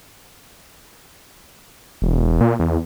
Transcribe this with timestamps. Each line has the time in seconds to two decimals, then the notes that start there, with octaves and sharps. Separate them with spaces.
2.02 E1
2.41 A#2
2.60 E2